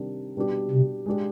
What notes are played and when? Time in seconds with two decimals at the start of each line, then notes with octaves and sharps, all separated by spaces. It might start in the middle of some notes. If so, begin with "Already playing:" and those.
Already playing: C3 D#3 G3 D4
0.37 B2 G3 D4 G4
0.71 C3
1.06 G#3 D4 G4